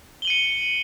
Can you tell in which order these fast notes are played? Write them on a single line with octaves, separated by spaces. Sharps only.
G7 F#7 D#7 C#7